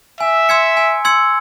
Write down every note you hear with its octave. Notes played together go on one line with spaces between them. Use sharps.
E5 G#5
C6 E6 G#6 C#7
G#5
C6 E6 G#6 C#7